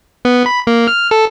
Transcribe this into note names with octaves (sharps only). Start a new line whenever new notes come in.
B3
B5
A#3
F6
A4